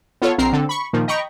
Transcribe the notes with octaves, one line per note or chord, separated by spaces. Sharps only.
B3 F4 A4 C#5
A#1 C4 A#4 A#5 C7
D3 C4 A4
B5 C#6
A#2 D#3 F3
D#5 G5 A#5 B5 C#6